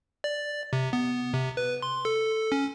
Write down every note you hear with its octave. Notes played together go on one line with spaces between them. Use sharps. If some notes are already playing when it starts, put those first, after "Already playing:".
D5
C3
B3
C3
B4
C6
A4
C#4